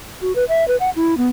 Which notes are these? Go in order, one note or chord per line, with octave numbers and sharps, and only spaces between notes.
F#4
B4
E5
B4
F#5
E4
B3